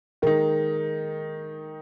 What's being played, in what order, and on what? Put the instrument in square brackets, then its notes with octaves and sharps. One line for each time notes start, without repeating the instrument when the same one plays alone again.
[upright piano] D#3 G#3 D#4 [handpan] A#4